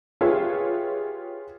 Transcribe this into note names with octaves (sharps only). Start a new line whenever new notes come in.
F4 G4 G#4 B4 C#5 E5